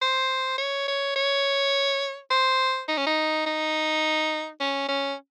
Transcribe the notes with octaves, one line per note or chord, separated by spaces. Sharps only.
C5
C#5
C#5
C#5
C5
D#4
C#4
D#4
D#4
C#4
C#4